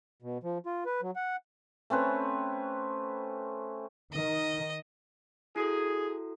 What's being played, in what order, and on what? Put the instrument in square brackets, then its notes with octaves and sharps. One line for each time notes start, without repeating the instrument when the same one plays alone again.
[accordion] B2
F3
F4
B4
F#3
F#5
[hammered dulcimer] A3 C4 C#4 B4
[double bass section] D#3 [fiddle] D#5
[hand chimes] E4 F#4 A4 [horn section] G#4